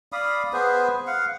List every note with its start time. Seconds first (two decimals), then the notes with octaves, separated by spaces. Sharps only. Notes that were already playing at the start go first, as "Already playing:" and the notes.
0.12 D5 F5 B5 D#6
0.53 B3 G#4 B4 C5
1.07 F5 F#5